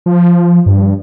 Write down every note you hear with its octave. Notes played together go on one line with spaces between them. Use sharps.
F3
G2